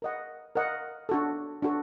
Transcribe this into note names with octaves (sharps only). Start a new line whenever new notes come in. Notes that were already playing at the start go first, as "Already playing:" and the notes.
A#4 D#5 F#5
A#4 D#5 F#5
D4 F#4 A4
D4 F#4 A4